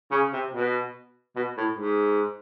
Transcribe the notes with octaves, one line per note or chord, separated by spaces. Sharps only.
C#3
C3
B2
B2
A2
G#2